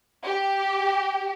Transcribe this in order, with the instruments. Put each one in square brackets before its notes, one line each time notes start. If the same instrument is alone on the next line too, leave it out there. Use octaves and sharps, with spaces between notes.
[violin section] G4